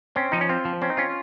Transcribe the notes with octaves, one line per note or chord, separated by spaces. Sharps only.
C4 C#4
F3 D#4
C#4
C4 F4
F3
C4 C#4
D#4
C#4 F4